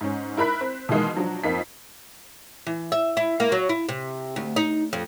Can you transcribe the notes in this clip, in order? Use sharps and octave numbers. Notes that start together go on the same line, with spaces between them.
G#2 C#4
E4 A#4 B5 F#6 B6
C4
B2 D#3 E3 G#3 A#3
F3 F#3 D4
F2 F3 A#3 D#4 B6
E3
E5
E4
A#3
F#3
E4
C3
D2
D#4
F2